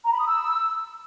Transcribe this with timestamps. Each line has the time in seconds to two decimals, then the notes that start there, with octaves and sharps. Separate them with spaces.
0.05 A#5
0.12 B5
0.19 D#6
0.26 E6